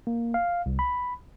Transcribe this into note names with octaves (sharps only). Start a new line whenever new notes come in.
A#3
F5
C2
B5